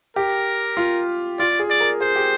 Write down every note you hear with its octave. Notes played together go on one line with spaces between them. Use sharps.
G4 A#4
F4
F4 D5
G#4
D5
A#4
G#4 C5
G4